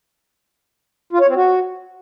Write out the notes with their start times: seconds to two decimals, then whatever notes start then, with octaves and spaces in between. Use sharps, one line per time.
1.13 F4
1.20 C#5
1.28 C4
1.35 F#4